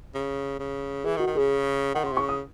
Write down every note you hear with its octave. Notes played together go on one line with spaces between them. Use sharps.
C#3
C#3
E3 G#4
D#3
F#4
D#3
C#3 G#4
D#3 F#5
C#3 C6
C3
C#6
C#3
D#6